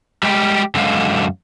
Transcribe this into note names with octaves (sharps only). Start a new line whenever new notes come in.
G3 G#3 G4
F#2 D3 F#3 G#3 F5